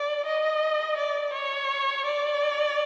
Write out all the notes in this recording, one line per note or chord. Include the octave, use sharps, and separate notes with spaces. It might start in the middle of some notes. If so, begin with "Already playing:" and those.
Already playing: D5
D#5
D5
C#5
D5